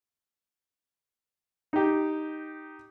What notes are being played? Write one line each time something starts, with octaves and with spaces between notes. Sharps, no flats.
D#4 G4